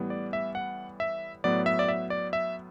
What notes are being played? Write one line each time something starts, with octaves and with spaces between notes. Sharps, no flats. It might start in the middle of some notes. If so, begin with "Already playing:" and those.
Already playing: A2 E3 G3 B3
D5
E5
F#5
E5
A2 F#3 B3 D5
E5
D5
E5
D5
E5